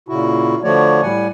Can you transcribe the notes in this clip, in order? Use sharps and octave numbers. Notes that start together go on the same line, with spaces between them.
A#2 C#3 E4 F#4
D3 F3 A3 F#4 C#5 D5
A2 G3 F#5 G#5